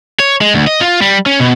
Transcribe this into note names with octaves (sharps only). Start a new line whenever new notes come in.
C#5
G#3
D2
D#5
F4
G3
C#4
B2